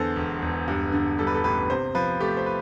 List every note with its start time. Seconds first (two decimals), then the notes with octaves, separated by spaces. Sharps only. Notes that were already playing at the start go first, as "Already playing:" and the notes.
Already playing: E2 D3 A4 C5
0.16 E1
0.42 E1
0.68 G2
0.92 D3
1.18 G3 A4
1.27 B4
1.34 A4
1.44 A1 B4
1.70 C3 C5
1.95 F3 B4
2.20 A3 G4
2.37 C5
2.46 B4